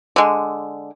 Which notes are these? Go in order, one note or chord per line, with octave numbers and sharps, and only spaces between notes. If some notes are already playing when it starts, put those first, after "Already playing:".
D3 G#3